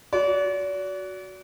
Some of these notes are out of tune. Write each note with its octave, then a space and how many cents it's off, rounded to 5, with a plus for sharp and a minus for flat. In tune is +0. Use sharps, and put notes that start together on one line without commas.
F#4 +0 D5 -40